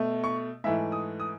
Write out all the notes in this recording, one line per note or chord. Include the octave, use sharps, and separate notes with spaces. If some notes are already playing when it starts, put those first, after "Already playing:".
Already playing: B2 A3
C#6
G#2 E3 A3 E5
D#6
D#6